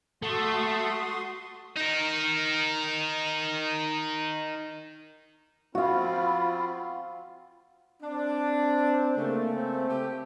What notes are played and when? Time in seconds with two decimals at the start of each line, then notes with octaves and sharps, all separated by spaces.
0.22 A3 F#4 C6 D#6
1.76 D#4 A#4
5.75 F3 C4 F4 F#4 F5 B5
8.03 C4 D4
9.18 C#3 A3 A#3
9.54 C4
9.90 A3 G4